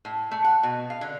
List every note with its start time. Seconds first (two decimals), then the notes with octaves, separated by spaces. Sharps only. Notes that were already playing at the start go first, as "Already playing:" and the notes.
0.05 A2
0.31 A3
0.44 F#5
0.63 B2
0.90 F5
1.01 D3